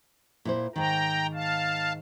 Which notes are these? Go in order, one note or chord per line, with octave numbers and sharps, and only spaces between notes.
A#2 E4 C5
G#2 D#3 G5 A#5
F5 A5